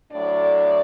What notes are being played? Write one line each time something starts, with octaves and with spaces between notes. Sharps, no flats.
A2 F#3 A3 D4 D5